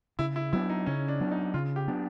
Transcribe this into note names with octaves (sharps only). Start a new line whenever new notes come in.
C#3 E4
E4
F#3 B3 D4 E4
D#4
C#3 C#4
D4
F#3 B3 D4
D#4
C#3 F4
G4
F#3 B3 D4